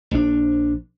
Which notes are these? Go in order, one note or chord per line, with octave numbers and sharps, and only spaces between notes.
A#1 D4